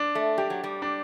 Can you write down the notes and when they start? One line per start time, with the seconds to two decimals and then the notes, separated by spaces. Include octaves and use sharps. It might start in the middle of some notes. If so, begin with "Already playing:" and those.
Already playing: D4
0.15 A3
0.38 G3 G4
0.50 F#3
0.64 G3
0.82 D4